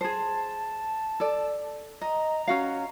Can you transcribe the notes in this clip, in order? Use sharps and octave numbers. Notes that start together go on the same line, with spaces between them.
G#4 C5 A5
A4 D5
D#5 A#5
C#4 F#4 F5